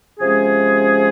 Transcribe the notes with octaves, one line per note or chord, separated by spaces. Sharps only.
C3 F3 G#3 C#4 G#4